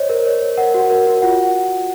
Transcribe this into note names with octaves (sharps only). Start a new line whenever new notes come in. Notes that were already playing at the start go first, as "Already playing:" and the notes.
Already playing: C5 C#5 D#5
A#4
C#5
C#5
A#4 F#5
F#4
A#4
F#4
F4 F#5